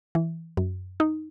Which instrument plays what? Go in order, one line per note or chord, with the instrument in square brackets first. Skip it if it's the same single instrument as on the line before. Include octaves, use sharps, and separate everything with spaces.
[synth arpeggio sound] E3
F#2
D#4